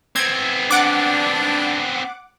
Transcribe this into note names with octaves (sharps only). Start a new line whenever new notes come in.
B3 C4 G#6
D4 F#5 D6